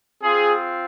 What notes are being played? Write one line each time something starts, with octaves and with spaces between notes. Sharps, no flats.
C4 F4 G#4